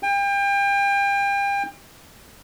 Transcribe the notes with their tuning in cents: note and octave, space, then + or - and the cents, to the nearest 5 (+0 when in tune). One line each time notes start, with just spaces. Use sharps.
G5 +35